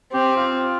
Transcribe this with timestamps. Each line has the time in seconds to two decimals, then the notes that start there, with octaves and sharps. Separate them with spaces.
0.13 C4 G4
0.37 F4